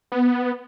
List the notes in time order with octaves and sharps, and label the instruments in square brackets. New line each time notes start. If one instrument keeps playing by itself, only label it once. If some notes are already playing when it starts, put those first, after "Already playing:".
[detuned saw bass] B3